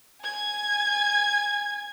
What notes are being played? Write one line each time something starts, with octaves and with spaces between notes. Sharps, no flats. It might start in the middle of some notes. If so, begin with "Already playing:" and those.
G#5 G#6